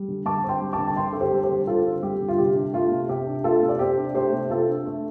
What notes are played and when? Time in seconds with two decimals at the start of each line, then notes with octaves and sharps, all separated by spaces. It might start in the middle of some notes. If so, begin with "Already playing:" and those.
Already playing: G3
0.08 D3
0.26 D3 A5 D6
0.44 C4
0.49 G5 C6
0.61 G3
0.73 A5 D6
0.78 D3
0.87 A5
0.96 D3 G5 C6
1.13 C4 A4
1.20 G4 C5
1.32 G3
1.44 G4 C5
1.49 D3
1.67 D3 F4 A4
1.85 C4
2.02 G3 G4
2.20 D3
2.28 F4
2.38 C3 G4
2.56 D4
2.73 A3 F4
2.91 C3
3.09 C3 G4
3.27 D4
3.44 A3 F4 A4
3.62 C3
3.69 D5
3.79 C3 G4 C5
3.97 D4
4.14 A3 G4 C5
4.33 C3
4.50 C3 F4 A4
4.68 D4
4.86 A3